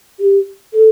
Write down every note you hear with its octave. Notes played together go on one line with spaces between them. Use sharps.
G4
A4